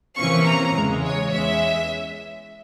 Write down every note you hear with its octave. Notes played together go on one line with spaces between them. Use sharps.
C3 E3 A#3 C#4 C#6
A#5
E2 C#3 E3 G#3
C#5
E2 E3 G#3 C#4 E5